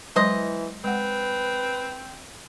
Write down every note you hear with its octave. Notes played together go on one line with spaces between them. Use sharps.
E3 F#3 G#3 E4 C5 D#5
G#3 C4 B4 F#5